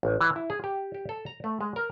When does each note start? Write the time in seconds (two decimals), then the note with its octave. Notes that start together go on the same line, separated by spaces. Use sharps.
0.03 A1
0.21 E3
0.36 E4
0.50 G#4
0.64 G4
0.94 G4
1.09 A4
1.26 A#5
1.44 A3
1.61 G#3
1.76 A#4